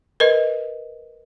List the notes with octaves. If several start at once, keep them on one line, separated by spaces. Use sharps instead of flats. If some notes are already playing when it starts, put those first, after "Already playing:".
A#4 B4 D#5